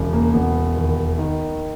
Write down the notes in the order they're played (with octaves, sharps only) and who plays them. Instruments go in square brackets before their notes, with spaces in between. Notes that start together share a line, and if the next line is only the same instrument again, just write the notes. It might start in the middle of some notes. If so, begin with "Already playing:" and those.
Already playing: [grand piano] E1 C#3
A#3
E1 B3
D#2
D#3